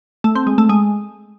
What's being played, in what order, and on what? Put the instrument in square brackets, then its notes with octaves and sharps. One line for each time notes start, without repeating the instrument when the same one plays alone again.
[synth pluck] A3
C4
G#3
A3
G#3